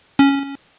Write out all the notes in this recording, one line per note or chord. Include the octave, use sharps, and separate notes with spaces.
C#4